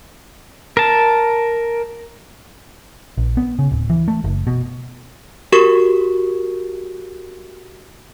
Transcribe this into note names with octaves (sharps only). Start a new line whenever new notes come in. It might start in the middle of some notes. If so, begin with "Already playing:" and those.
A#4 A5
A#1
B3
C#3
D1
E3
A3
F#1
B2
F#4 G4 A#4 C#6